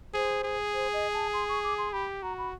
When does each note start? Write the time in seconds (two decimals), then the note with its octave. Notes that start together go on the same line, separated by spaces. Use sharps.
0.14 G#4 C5
0.44 G#4
0.74 C5
0.93 D#5
1.13 A5
1.33 C6
1.49 C#6
1.63 D6
1.78 C6
1.93 G4 B5
2.23 F#4 A#5
2.38 B5